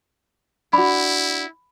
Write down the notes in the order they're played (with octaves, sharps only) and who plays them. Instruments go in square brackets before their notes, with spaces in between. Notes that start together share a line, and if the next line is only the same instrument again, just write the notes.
[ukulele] D4 F#4 [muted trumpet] E4 [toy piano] B5